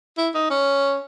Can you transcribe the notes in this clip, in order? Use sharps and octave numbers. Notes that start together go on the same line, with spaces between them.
E4
D#4
C#4